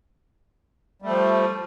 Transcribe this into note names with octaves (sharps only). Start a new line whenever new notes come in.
F3 G3 A3